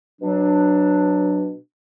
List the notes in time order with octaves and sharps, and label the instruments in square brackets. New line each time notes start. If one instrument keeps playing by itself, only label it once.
[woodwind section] B2 F#3 D4